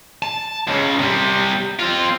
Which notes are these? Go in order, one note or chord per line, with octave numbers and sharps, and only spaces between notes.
A5
C#2 C#3
C3 G3
C4 F4